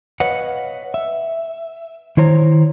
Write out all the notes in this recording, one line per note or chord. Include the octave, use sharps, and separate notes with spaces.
B4 C#5 D#5 F5 F#5
E5
D#3 E4 C5 C#5 A#5